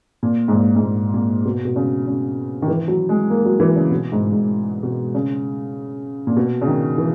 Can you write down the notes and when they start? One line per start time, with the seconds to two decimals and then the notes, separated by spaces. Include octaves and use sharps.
0.23 A#2
0.48 G#2
0.53 A#2
0.75 G#2
0.83 A#2
1.14 A#2
1.45 B2
1.65 B2
1.76 C#3
2.07 C#3
2.62 D#3
2.68 E3
2.88 F#3
3.09 G#3
3.30 A#3
3.45 F#3
3.60 E3
3.76 C#3
3.91 B2
4.12 G#2
4.32 G#2
4.83 B2
5.15 C#3
6.27 A#2
6.36 B2
6.61 C#3
6.67 D#3
6.98 E3